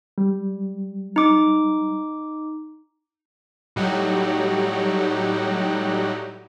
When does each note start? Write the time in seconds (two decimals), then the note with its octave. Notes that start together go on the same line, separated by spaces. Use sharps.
0.18 G3
1.16 D#4 D6
3.76 A2 F#3 G3 D#4 F#4 G4